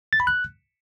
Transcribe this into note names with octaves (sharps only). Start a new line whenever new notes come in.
A6
B5
F#6